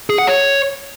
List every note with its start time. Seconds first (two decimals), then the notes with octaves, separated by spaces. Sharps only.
0.10 G#4
0.18 F#5
0.27 C#5